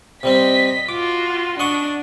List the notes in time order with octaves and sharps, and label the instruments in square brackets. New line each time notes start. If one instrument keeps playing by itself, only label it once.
[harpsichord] C3 G3 C4 [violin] D#5 B6
[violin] F4 F#4 [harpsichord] D6
[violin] D4 [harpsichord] D#5 F#5 C#6